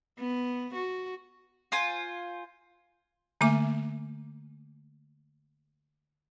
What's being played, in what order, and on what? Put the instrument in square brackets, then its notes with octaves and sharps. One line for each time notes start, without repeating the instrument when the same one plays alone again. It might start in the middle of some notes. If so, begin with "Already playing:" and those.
[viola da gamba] B3
F#4
[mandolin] F4 C5 G#5
[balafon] D3 A3 A#3 G#5 D6